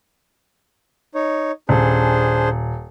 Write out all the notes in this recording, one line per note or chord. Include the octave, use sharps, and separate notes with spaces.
D#4 C#5
D#1 D4 G#4 C5